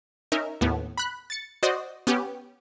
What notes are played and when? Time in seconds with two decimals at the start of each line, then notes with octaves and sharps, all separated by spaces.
0.32 C#4 D#4 A#4 E5
0.61 D#2 A2 B3
0.98 B5 F#6
1.30 A6 C#7
1.63 F#4 C5 D5 D#5
2.07 B3 C#4 G4